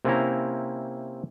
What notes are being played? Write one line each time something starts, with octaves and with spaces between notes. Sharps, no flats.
C3 A#3 C4 C#4 E4 A#5